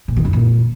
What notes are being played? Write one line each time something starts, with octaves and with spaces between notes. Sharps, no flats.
A#2
D#3
F#2
A#2